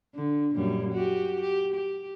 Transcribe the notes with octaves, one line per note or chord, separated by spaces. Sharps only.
D3
F#2 A#2 G3
F#4 G4
G4
G4